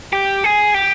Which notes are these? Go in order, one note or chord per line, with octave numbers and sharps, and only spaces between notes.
G4
G#4
G4